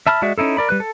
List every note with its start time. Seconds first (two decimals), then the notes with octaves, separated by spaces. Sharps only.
0.07 E5 A5 B5 F6
0.22 G#3 F#4 D5 E5
0.38 C#4 D#4 E4 A4
0.57 A#4 D5 B5
0.69 G3 B4 F#6
0.80 A4